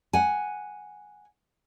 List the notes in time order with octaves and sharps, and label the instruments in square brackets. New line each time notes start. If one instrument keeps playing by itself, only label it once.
[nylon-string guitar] F#5 G#5